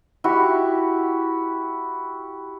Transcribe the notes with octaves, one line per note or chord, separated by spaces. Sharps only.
E4 F#4 G4